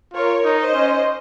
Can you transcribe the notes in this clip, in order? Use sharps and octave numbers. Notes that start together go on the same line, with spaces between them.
F4 A#4 C#5
D#4
C5 D#5
C#4